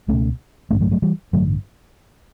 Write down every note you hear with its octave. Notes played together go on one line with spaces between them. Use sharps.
C#2 B2 A3 C#4
A1 G2 D3 A3 C#4
F#3 A3
F#3 A3
E3 G3
A1 G2 D3 F#3 A3